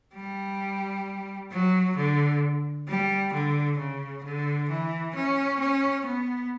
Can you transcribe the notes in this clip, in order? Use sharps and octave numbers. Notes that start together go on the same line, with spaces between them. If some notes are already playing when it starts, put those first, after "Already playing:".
G3
F#3
D3
G3
D3
C#3
D3
E3
C#4
C#4
B3